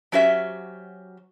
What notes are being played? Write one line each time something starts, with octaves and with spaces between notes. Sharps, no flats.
F#3 C#4 F#4 G4 C5 E5